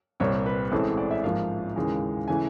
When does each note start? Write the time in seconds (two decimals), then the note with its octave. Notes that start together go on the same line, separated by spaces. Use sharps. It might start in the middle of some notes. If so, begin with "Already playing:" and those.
0.20 C2 A#2 G3 C4 C#5
0.46 B4
0.71 A1 A2 E3 G#3 C4 A4
0.98 D5
1.11 E5
1.23 G#2 F3 A#3 F5
1.76 D#2 C#3 E3 G#3
2.28 C#3 E3 A3 G#5